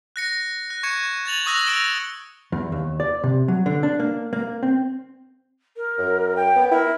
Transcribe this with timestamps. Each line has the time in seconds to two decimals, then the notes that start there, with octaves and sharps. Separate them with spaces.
0.16 F#6 A#6 C#7
0.70 F#6
0.83 C#6 G#6 C#7 E7
1.26 G#6 A6 F7 F#7
1.46 C#6 D#6 E6 F#6 A#6 F7
1.66 E6 A#6 D7 E7 G7
2.52 E2
2.72 D#2
3.00 D5
3.24 C3
3.48 F#3
3.66 D3
3.83 D4
4.00 A#3
4.33 A#3
4.63 C4
5.76 A#4
5.98 F#2
6.36 G5
6.56 B3
6.71 E4 A#4